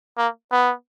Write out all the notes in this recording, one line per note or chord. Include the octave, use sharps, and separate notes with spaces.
A#3
B3